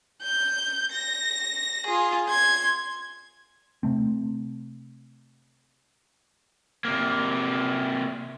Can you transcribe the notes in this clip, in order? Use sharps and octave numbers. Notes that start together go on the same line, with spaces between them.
G6
A#6
F4 G#4
C6 G#6
C3 A3 C4
C3 A#3